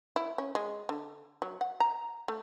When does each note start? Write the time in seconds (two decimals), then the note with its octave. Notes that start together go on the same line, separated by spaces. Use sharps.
0.16 E4
0.38 C#4
0.55 G#3
0.89 D3
1.42 F#3
1.61 F#5
1.80 A#5
2.28 A3